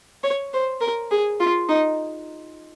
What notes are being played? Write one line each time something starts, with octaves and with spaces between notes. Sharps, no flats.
C#5
C5
A#4
G#4
F4
D#4